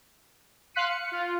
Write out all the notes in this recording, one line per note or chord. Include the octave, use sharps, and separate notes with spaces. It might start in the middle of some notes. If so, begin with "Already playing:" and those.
F5 C6 F#6 B6 C#7 D#7
C#7
F4